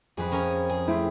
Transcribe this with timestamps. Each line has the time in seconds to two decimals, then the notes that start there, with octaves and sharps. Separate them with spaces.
0.17 F2 G#4 B4
0.32 C#4 A#4 G#5
0.70 G#4
0.88 A3 C4 E4